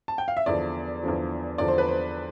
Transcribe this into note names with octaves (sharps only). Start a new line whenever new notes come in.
A5
G5
F5
E5
E2 D3 F3 D5
E2 D3 F3
E2 D3 F3 D5
C5
B4
C5